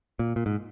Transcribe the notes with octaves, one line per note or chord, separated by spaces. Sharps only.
A#2
A#2
G#2